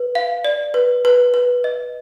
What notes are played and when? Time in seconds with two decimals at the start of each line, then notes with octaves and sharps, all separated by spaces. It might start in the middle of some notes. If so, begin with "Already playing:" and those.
Already playing: B4
0.15 F5
0.45 D5
0.74 B4
1.05 B4
1.34 B4
1.64 D#5